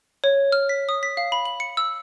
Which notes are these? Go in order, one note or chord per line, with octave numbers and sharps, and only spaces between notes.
C#5
F6
B6
D#6
B6
F5
B5
F#7
C#7
E6